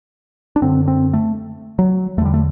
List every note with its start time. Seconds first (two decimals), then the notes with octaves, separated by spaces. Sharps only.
0.56 D4
0.62 F#2 D3 C4
0.88 C4
1.13 A3
1.79 F#3
2.18 E2 A3
2.21 D3 G3
2.34 A3